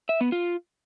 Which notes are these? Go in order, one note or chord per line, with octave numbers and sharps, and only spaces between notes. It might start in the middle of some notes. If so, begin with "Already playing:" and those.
E5
B3
F4